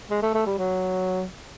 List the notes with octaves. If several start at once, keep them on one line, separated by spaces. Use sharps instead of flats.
G#3
A3
A3
G3
F#3